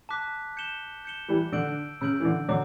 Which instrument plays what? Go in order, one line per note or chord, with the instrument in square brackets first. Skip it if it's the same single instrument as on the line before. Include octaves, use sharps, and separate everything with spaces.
[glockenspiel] A5 D6 F#6 B6
G6 C#7 E7 G7
G6 C#7 E7 G7
[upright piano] E3 G3
[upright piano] D3 [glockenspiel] E6 G6 D7 F#7
[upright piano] C#3 [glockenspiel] E6 G6 D7 F#7
[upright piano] E3
D3
[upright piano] D3 F#3 [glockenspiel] D6